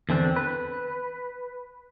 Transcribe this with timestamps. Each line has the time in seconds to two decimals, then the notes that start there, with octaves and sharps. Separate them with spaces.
0.09 E2 D3 C4 D4
0.36 B4